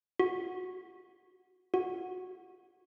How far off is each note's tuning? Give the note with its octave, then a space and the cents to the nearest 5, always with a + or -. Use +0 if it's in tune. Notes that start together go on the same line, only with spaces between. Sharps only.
F#4 -10
F#4 -10